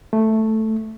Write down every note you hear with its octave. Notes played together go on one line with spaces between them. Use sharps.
A3